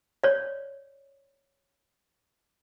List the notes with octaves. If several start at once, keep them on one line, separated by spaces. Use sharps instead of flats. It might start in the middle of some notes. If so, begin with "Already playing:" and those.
C#5 D5